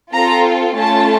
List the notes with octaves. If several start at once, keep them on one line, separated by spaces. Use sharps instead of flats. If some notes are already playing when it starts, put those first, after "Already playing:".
C4 F4 A4 A#5
A3 C#4 F4 A5